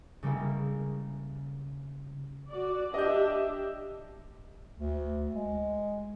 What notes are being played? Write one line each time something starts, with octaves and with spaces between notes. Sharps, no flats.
C#3 G3 G#3 A#3 E4
F#4 D5
D4 G4 D#5 E5 G6
G4
D2
G#3